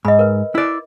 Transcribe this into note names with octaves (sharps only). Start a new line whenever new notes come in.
G#2 D#5 B5
A#4 B4
E4 D5